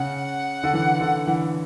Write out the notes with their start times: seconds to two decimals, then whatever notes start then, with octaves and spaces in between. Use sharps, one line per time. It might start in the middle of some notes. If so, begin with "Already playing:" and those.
Already playing: C#3 F#5
0.64 D3
0.73 E3
1.01 D3
1.27 E3